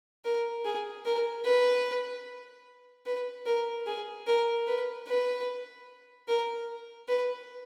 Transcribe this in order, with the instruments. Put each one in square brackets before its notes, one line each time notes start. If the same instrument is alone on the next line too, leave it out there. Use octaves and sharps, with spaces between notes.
[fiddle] A#4
G#4
A#4
B4
B4
A#4
G#4
A#4
B4
B4
A#4
B4